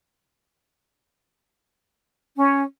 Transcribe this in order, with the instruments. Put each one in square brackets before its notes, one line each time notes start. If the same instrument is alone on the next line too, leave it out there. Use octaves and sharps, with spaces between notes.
[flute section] C#4